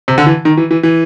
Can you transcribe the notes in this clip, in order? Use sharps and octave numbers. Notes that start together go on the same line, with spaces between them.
C3
D3
E3
D#3
E3
E3
E3